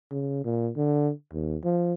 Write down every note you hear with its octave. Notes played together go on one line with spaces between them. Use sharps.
C#3
A#2
D3
D#2
F3